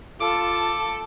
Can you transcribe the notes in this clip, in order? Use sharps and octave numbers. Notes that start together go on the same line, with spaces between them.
F4 A4 A5 D6